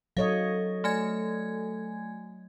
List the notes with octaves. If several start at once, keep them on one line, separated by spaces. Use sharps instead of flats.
F#3 A4 C#5 D#5 F5
A3 G#5 G#6